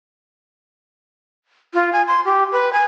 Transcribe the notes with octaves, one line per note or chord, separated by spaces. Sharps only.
F4
G#5
C6
G4
B4
G#5